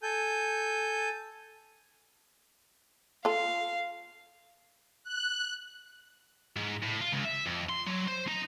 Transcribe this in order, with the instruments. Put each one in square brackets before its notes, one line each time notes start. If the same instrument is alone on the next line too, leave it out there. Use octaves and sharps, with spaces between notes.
[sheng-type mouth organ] A4 G#5 G6
[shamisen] F4 A4 [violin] F5
[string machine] F#6
[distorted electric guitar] G#2
A2
F4
C#2
E5
F2
C6
F#3
C5
D#4